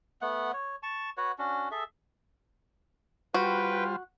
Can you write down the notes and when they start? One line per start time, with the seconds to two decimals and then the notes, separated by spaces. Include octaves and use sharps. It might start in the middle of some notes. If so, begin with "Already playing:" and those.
0.22 A3 B3 F#5
0.53 C#5
0.83 A5 C#6
1.17 F#4 B4 C#5 F#5
1.38 C#4 D4 F#4
1.71 G#4 A4 E5
3.34 G3 F4 F#4 B4 C5 G5